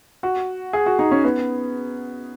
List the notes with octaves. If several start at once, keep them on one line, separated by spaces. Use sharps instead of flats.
F#4
G#4
F#4
D#4
C#4
B3